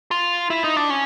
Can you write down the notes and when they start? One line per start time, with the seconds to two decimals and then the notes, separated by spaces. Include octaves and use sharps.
0.11 F4
0.50 E4
0.64 D#4
0.77 D4
0.90 C#4